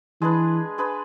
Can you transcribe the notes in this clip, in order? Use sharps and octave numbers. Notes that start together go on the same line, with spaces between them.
E3 G#3 D4 G#4 B4
G#3 D4 G#4 B4